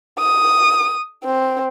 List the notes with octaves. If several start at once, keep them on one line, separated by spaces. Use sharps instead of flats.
D#6
C4